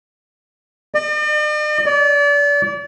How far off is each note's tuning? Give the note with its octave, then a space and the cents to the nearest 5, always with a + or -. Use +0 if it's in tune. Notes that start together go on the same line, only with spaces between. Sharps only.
D5 +45
D5 -35